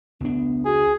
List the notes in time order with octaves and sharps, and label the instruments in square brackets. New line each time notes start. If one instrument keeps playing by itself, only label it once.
[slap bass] C#2 D4 [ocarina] B3
[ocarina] F#4 [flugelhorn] G#4